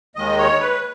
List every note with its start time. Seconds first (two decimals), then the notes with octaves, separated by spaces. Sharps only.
0.16 D#2 D#3 G#3 D#5
0.38 C#5
0.60 B4